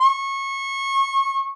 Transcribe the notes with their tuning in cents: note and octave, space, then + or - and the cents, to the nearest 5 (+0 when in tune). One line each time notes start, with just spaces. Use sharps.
C#6 -25